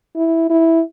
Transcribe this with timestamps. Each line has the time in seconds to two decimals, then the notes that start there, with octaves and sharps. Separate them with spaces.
0.16 E4
0.50 E4